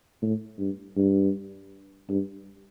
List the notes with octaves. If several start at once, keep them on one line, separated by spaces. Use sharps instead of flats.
A2
G2
G2
G2